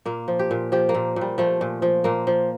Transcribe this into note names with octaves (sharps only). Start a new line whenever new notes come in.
A#2 A#3
F3
G4
A#2
F3 G4
A#3
A#2
A#2
G3
F3 A3
A#2
F3
A#2 A#3
F3